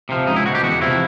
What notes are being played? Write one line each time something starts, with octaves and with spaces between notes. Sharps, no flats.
C3 F3
C#2 D#4
E4
B2 F#4
G4
E2 F#4
C3 F3 E4